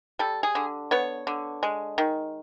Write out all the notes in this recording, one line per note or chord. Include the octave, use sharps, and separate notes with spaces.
G3 A4
G#4
D3
B3 C#5
D3
G#3
D#3